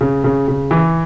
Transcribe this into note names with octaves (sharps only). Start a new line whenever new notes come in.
C#3
C#3
C#3
E3